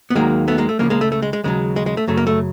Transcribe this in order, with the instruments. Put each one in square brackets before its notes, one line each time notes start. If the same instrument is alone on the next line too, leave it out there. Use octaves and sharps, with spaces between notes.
[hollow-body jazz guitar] B3
D#2 D#3 F#3 G#3 A#3
A3 B3
G#3 A#3
A3
C#2 C#3 F3 G#3 A#3
G#3 A#3
A3
A3
G#3
G#3
D#2 C#3 F#3 G#3
G#3
G#3
A3
F#2 C#3 F#3 A3
A#3
A3